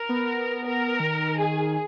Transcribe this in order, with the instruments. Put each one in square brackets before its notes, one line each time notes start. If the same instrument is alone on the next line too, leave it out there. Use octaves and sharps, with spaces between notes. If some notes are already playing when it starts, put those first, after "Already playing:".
Already playing: [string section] A#4
[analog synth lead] B3
[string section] A#4
[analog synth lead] D#3
[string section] G#4